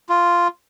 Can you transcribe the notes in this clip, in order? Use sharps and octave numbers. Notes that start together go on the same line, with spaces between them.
F4